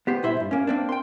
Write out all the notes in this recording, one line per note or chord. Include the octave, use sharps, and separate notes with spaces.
B3 G4 C5
C2 A#2 E4 C5 E5
E2 G2
A#3 C#4
A#3 C4 D4
G5 C6